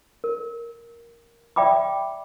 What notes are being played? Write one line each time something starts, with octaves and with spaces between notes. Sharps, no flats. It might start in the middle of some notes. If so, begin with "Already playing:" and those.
A#4
D5 E5 G5 B5 D6